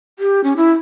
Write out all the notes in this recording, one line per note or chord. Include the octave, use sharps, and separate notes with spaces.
G4
C#4
E4